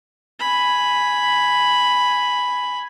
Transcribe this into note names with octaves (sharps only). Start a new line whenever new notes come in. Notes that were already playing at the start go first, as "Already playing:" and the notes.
G#5 B5